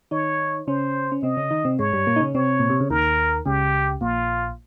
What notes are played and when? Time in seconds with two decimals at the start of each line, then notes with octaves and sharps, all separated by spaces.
0.11 D#3 D#4 C#5
0.67 C#3 C#4 C5
1.12 C#4
1.23 C3 C4 D#5
1.37 C#3 C#4
1.51 D#3 D#4
1.65 C3 C4
1.79 G#2 G#3 C#5
1.93 G2 G3
2.07 A#2 A#3
2.16 D#4
2.21 C#3 C#4
2.34 C3 C4 C#5
2.59 A#2
2.70 C3
2.80 C#3
2.90 D#2 D#3 A#4
3.46 C#2 C#3 G4
4.01 A#1 A#2 F4